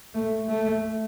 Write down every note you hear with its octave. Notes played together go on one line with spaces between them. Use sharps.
A3
A3